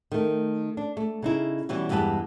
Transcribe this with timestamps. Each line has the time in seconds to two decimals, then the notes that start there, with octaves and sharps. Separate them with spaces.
0.12 D#3 A3
0.77 D4
0.97 A3
1.22 C#3 D#4 E4
1.69 B2 E3 G3 C#4
1.89 E2 G2 G#3 G4 B4 A5